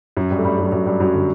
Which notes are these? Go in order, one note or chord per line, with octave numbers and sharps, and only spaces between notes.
F#2 F#3
G2 G3
A3
G2 G3
F#2 F#3
G3
F#2 F#3
G2 G3
F#2 F#3
D3